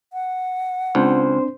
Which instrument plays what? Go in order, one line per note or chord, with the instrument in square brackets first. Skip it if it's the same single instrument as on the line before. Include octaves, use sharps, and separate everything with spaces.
[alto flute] F#5
[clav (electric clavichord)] C#2 [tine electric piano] C4 D4 [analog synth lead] C5